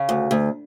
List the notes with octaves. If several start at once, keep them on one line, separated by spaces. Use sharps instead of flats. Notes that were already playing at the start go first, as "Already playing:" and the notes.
Already playing: C#3
D2
D2